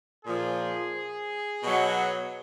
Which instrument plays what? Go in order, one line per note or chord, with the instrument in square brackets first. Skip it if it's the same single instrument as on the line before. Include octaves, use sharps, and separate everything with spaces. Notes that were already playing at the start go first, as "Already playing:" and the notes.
[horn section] A#2 F3 G#4
B2 F#3